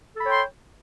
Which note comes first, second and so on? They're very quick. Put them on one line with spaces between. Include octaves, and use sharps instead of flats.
A4 B5 C#5 G5 C6